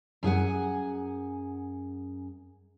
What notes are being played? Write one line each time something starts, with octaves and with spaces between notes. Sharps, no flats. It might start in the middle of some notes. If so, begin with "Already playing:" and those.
F#2 G#4 F#5 G#5